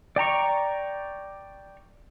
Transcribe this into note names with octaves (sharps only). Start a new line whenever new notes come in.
D5 G5 A#5 C#6